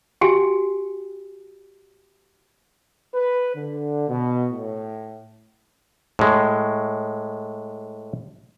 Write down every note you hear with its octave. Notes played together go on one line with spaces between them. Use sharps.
F#4 G4 G5 G#5
B4
D3
B2
A2
A2 G#3